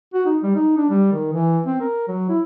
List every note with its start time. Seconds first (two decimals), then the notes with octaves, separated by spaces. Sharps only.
0.14 F#4
0.26 D#4
0.43 G3
0.55 D#4
0.77 D4
0.90 G3
1.13 D#3
1.33 E3
1.66 C4
1.81 A#4
2.08 F#3
2.29 E4